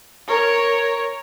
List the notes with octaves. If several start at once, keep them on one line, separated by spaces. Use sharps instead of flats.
A#4 C#5